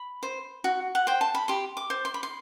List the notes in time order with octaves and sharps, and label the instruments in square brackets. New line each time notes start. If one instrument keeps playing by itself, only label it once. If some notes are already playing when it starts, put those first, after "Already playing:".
Already playing: [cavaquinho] B5
C5
F#4
F#5
C5 G5
A5
B5
G4 C6
D6
C5
C6
B5
C6